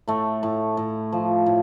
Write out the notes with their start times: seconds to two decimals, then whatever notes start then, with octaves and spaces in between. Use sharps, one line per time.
0.08 A2 A3
0.43 A2
0.77 A2
1.12 F3
1.46 A2